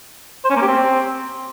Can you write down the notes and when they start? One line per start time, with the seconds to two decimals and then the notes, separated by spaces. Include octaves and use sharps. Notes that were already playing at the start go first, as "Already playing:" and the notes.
0.44 C5
0.50 C#4
0.56 A#3
0.62 G4
0.67 C4